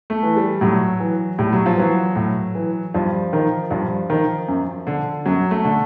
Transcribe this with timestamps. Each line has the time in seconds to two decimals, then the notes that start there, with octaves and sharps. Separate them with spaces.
0.10 A3
0.23 E3
0.36 G3
0.61 A2 F#3
1.00 E3
1.39 A2 G3
1.52 F#3
1.66 F3
1.77 E3 F#3
2.16 A2
2.55 E3
2.94 G2 F3
3.33 D#3
3.71 G2 F3
4.10 D#3
4.48 F#2
4.87 D3
5.26 F#2 F#3
5.51 A3
5.64 D3